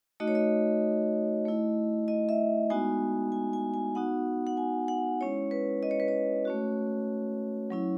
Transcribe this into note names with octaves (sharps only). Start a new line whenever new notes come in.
A3 D#4 F#4 D#5
C#5
D#5
A3 E4
D#5
E5
G#3 B3 D#4 F#4 G#5
G#5
G#5
G#5
B3 D#4 F#4 F#5
F#5
G#5
F#5
G#3 C#4 E4 C#5
B4
D#5
C#5
B4
C#5
A3 C#4 F#4
F#3 C#4 E4